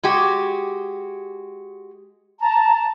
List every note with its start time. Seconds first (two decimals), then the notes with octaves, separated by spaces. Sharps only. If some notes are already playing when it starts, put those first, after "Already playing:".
0.03 G#3 F#4 G4
2.40 A5 A#5